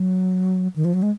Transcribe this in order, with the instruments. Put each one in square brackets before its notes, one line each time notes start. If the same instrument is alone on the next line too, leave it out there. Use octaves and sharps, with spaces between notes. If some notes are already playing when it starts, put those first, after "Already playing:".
Already playing: [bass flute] F#3
D#3
F3
F#3
G#3